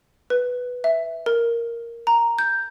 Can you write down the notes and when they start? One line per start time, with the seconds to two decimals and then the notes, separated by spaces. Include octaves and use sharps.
0.30 B4
0.84 E5
1.26 A#4
2.07 A#5
2.39 G6